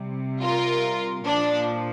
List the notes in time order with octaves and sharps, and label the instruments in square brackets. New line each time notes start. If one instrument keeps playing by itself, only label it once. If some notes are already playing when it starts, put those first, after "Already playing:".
Already playing: [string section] C3 G3
F4 A#4
A#2 F3 D4